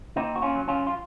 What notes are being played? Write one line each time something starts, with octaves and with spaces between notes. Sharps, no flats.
A#2 C4 D#4
F#4
C#4 F4
F#3
C#4 F4
F4